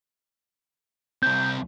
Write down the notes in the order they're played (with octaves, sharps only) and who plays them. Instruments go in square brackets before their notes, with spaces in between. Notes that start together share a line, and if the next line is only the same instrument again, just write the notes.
[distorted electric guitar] C2 C4 [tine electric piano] G6